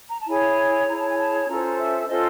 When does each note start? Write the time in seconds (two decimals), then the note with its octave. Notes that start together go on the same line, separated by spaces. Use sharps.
0.09 A#5
0.19 A5
0.28 E4 G#4 C#5 G#5
0.88 E4 G#4 C#5 A#5
0.98 A5
1.08 G#5
1.18 A5
1.48 C#4 F4 A4 C5 A#5
1.78 E5
2.07 C#4 F4 A4 C5 D#5